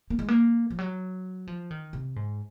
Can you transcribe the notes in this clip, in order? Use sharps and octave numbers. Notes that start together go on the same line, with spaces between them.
A#3
G#3
A#3
F3
F#3
F3
D#3
C3
G#2